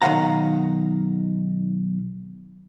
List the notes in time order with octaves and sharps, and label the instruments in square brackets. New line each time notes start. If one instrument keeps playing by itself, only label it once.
[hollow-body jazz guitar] B1 D#3 F3 F5 F#5 A#5